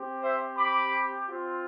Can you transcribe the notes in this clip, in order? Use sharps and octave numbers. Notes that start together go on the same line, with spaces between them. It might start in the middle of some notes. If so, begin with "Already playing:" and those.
Already playing: C4 G4
C5 E5
B5 D6
C4 F4